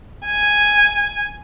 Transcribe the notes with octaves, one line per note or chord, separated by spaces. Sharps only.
G#5